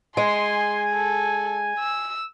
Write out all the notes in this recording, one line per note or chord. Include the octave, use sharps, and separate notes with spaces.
G#3 G#5 C6
A4
E6